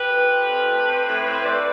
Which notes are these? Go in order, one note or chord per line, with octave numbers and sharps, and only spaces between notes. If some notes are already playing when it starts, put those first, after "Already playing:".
Already playing: G4 B4
F2
F2
F2
A3
C4
A2
C4
C5
A3 B4 D5